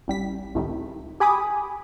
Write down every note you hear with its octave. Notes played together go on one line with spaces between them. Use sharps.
A1 G3 B6
C#2 A2 C3 D#3 G3
G4 G#5 B5 D6 D#6